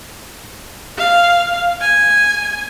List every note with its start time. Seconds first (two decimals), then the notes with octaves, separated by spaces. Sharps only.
0.98 F5
1.81 G#5